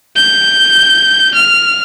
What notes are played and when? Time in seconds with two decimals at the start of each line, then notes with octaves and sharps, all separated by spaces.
0.16 G6
1.34 F6